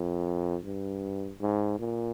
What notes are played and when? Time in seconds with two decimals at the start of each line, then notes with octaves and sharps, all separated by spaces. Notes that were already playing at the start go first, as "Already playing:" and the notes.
Already playing: F2
0.64 G2
1.41 G#2
1.79 A#2